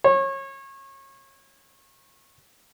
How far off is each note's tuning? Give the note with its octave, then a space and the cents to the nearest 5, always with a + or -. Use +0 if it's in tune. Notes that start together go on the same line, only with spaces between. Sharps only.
C#5 -30